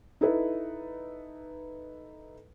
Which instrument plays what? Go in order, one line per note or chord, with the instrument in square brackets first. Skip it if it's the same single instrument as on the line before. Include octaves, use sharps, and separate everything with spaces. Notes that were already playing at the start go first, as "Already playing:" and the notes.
[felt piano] D#4 E4 A4 B4